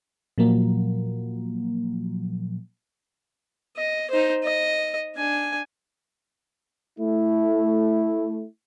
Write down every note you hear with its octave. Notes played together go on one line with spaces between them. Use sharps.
A#2 F3 F#3 A#3
D#5
D#4 C5
D#5
D4 G#5
A3 E4